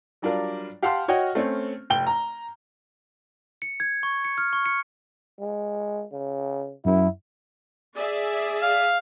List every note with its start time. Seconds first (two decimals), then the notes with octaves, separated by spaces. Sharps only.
0.22 F#3 G3 D4 F4 A#4 D5
0.82 G4 F5 F#5 A5 C6 F6
1.08 F#4 C#5 D#5 F#5 G5
1.35 A3 C4 C#4
1.90 F1 G5 G7
2.07 A#5
3.62 C#7
3.80 G#6
4.03 C#6
4.25 C#7
4.38 F6
4.53 C#6
4.66 C#7
5.40 G#3
6.12 C#3
6.85 F#2 E4
7.97 G#4 D5 E5
8.62 F5